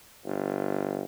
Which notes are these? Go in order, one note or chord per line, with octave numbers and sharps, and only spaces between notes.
G1